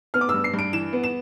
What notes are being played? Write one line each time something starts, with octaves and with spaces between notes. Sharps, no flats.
B3 F6
D6
G2 E6
C7
G2 D7
E3 E7
B3
E7